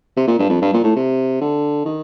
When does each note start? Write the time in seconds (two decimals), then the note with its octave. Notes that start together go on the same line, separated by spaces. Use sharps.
0.17 C3
0.27 A#2
0.39 G2
0.50 F2
0.62 G2
0.73 A#2
0.84 A2
0.96 C3
1.41 D3
1.85 D#3